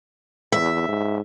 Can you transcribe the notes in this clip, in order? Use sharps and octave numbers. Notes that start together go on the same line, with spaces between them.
E2 E5
G#2